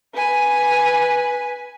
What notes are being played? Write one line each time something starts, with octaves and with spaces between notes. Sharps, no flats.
B4 G#5